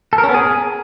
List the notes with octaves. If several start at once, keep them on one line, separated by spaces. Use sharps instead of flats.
A4
A#4
C#4
B3
G#4